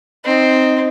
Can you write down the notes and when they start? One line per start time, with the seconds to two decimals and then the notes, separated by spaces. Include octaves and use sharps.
0.25 C4 D#4